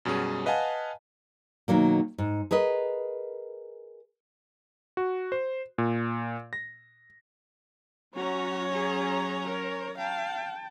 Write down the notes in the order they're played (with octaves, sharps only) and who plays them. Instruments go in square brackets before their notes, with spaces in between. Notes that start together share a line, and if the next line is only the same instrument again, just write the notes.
[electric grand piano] F#2 B2 G3 C#4 G#4
B4 D#5 F5 F#5 G#5 A5
[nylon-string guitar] B2 D#3 F#3 A#3
G#2
G#4 A#4 B4 D#5
[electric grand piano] F#4
C5
A#2
A#6
[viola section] F#3 C#4 A#5 [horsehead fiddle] F#4 [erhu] C#5
[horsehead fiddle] G#4
A#4
[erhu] F5 [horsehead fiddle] G5 A5